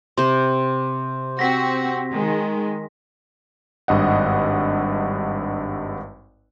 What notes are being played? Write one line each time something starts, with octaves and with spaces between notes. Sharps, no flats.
C3 C5 C6
C4 F#4 A#6 B6
D#3 G#3
G#1 G2 D#5 F#5